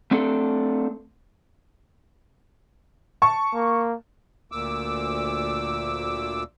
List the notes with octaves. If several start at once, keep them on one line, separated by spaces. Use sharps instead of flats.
A3 C4 D4 A4
A5 C#6
A#3
D2 A#2 D6 E6